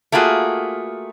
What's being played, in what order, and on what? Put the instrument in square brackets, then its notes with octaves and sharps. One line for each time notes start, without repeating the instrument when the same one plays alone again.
[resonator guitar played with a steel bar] A3 A#3 F4 F#4 G#4